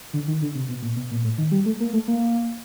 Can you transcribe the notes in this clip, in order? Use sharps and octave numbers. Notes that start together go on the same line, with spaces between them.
D3
D#3
D3
C3
B2
A#2
B2
A#2
A2
D#3
G3
A3
A#3
A3
A#3